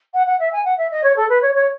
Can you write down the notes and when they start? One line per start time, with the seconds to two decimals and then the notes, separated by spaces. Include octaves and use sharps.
0.13 F#5
0.26 F#5
0.39 E5
0.52 G#5
0.64 F#5
0.77 E5
0.90 D#5
1.03 C#5
1.16 A4
1.29 B4
1.42 C#5
1.55 C#5